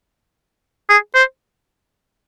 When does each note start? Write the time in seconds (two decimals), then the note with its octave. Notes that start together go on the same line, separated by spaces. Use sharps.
0.89 G#4
1.15 C5